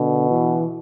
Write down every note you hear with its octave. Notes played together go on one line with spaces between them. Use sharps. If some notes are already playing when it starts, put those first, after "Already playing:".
Already playing: B2 D3
E3